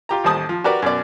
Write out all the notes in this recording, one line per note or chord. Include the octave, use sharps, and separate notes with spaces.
F4 G4 A#5
A1 D#2 G3 C5 A5 D#6
F3
F#4 G4 A#4 B4 D5
F#2 B2 D5